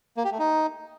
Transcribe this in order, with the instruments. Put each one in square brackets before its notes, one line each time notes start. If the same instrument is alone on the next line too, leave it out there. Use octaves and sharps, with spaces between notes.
[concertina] A#3
G4
A3
D#4